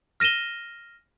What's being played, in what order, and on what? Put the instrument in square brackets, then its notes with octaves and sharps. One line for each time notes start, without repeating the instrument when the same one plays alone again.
[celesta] F6 A#6 D#7 E7 G7